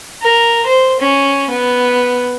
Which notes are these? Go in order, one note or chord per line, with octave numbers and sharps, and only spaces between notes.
A#4
C5
C#4
B3